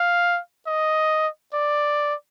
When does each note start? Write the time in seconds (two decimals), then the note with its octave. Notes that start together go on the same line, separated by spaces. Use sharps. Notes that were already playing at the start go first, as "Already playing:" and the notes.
Already playing: F5
0.67 D#5
1.54 D5